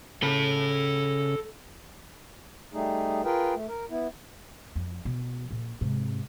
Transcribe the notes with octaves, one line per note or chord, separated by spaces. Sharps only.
C#3 A4 B5
G3 A3 D#4 G#4
F4 G#4 A#4 B4 G5
A3
A#4
B3 E4
F2
B2
A#1
G#2 C3